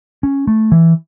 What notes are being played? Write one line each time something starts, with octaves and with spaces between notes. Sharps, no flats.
C#4
A3
E3